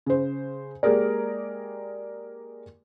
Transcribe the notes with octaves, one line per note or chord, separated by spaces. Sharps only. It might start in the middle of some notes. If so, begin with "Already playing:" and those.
C#3 C5
G#3 A#3 G4 G#4 A#4 D5